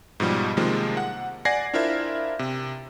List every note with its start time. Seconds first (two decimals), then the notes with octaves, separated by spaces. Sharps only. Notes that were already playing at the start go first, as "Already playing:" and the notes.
0.20 G#2 B2 F3 G3
0.57 C3 D#3 F3 G#3 A#3
0.97 F#5
1.45 D5 F#5 G#5 G#6 A#6 C7
1.74 D4 E4 F4 A#4 C5 E5
2.39 C3